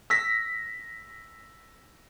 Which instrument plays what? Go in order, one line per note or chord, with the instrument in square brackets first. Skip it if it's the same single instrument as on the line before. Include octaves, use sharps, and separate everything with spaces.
[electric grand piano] E6 A#6 B6